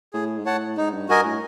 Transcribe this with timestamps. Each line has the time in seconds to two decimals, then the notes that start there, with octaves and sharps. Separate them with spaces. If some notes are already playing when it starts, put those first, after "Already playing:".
0.13 A2 G#4
0.38 G#2
0.45 A2 C#5 F#5 A5
0.77 G#2 D#4
0.93 G2
1.08 G2 F#4 A#4 D#5 G#5
1.26 A2